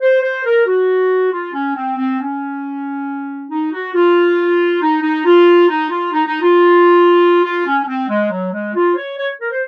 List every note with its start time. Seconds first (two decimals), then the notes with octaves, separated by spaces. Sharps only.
0.01 C5
0.21 C5
0.45 A#4
0.66 F#4
1.32 F4
1.53 C#4
1.75 C4
1.97 C4
2.19 C#4
3.49 D#4
3.72 F#4
3.94 F4
4.81 D#4
5.02 D#4
5.25 F4
5.69 D#4
5.90 F4
6.12 D#4
6.26 D#4
6.41 F4
7.44 F4
7.66 C#4
7.83 C#4
7.87 C4
8.08 G#3
8.30 F#3
8.52 G#3
8.74 F4
8.91 C5
8.97 C#5
9.18 C#5
9.40 A#4
9.51 C5